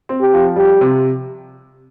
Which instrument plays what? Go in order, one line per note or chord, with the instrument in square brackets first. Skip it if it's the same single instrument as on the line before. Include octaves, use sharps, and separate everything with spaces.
[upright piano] C4
[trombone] G4
[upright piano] F3
[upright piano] G3 [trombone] G4
[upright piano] C3